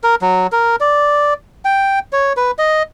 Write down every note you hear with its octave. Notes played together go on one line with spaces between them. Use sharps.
A#4
F#3
A#4
D5
G5
C#5
B4
D#5